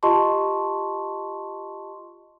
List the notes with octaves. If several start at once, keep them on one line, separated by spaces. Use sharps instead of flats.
F4 G4 D#5 A5 C6 C#6